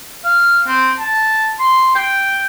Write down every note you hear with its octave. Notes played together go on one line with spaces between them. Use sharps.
F5
C4
A5
C6
G5